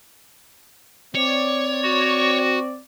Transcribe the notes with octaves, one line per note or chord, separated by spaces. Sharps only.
C4 C#5 D5
F#4